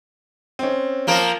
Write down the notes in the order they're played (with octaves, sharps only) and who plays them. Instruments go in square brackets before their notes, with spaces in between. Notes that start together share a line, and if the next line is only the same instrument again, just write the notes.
[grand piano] C4 C#4
[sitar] F3 A#3 A#4